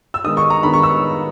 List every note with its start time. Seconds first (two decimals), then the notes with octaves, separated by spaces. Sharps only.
0.14 E6
0.24 D#3 G#3 B3 D#6
0.37 C#6
0.50 A#5
0.63 D#3 G#3 B3 B5
0.73 C#6
0.83 E6